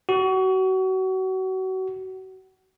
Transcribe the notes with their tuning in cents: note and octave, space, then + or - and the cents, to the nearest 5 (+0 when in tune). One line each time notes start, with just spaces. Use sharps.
F#4 +30